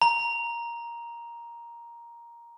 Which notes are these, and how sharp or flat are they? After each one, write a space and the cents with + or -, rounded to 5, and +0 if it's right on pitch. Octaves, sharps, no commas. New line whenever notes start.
A#5 +10